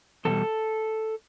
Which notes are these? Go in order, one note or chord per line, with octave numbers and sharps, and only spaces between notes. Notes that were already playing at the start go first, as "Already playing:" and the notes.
E2 B2 G3 A4